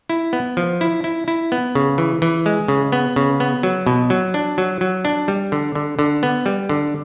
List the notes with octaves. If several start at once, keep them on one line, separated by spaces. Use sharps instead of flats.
E4
B3
F3
E4
E4
E4
B3
C#3
E3
E3
G#3
C#3
B3
C#3
B3
F#3
B2
F#3
D4
F#3
F#3
D4
G3
D3
D3
D3
B3
G3
D3